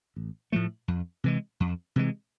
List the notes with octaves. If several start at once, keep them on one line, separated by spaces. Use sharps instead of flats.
A1
A2 F3 A3
F2
C3 E3 G#3
F2
C3 E3 G#3